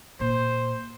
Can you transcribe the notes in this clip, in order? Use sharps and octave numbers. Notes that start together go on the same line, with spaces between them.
A#2 C5